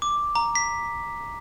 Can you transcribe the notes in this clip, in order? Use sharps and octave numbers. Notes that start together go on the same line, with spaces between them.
D6
A#5
B6